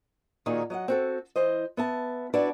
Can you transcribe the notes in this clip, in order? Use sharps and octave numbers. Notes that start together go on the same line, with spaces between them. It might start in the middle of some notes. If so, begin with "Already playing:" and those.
A#2 D#3 D#4 F#4 G#4
F#3 D#5 F5 F#5
C4 F#4 A4
E3 C5 D#5
B3 E5 A5
D4 E4 F#4 B4 D5 A5